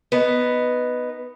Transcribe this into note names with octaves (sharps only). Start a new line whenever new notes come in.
B3 D#4